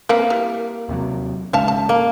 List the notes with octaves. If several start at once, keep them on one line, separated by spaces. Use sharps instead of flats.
A#3 C4 A#4 B4
E3 G3 A#4
D#2 C3 F#3
G#1 G#2 C#3 E5 F5 A5
A5
A#3